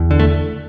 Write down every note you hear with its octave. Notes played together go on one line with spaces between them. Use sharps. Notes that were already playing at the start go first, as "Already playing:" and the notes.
Already playing: E2
D3
A3